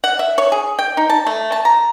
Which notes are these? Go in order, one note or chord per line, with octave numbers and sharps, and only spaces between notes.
F#5
E5
C#5
G#4
G5
D#4
A5
A3
A5
A#5